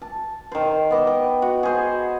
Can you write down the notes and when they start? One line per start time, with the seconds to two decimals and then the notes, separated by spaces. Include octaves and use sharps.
0.02 A5
0.52 D#3 C5
0.91 B3 D#5 D6
1.07 G5
1.42 F#4
1.63 G#4 C5